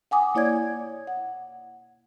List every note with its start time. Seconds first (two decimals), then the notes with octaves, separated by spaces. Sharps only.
0.11 F#5 G#5 D6 D#6
0.35 A#3 E4 C#5 D5 G#6
1.07 F#5